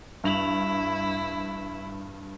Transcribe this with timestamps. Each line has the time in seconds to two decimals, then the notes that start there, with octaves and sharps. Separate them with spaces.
0.24 G2 E4 F7 F#7